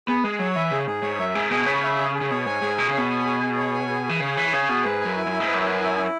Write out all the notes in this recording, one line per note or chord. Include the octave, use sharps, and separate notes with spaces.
B3 G#4
G#3 G#4
F#3 C#5
E3 E5
C#3 G#4
G#2 G#4
G#2 C#5
F#2 E5
G#2 G#4
B2 G#4
C#3 C#5
E5
G#4
G#4
C#3
B2 C#5
G#2 G#5
G#2 G#4
B2 G#4
C#3
B2 C#5
G#5
G#4
G#4
C#5
G#5
G#4
E3 G#4
C#3 C#5
E3 G#5
C#3 G#4
B2 G#4
G#2 B4
F#2 G#5
E4
F#2
E4
G#2
B4
F#2
G#5
E4
E4